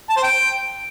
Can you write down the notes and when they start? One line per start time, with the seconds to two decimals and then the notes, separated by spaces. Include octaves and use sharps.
0.10 A5
0.16 C5
0.23 G5